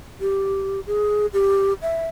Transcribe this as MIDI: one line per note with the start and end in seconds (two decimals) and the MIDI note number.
0.21 0.80 67
0.87 1.26 68
1.33 1.73 67
1.82 2.08 76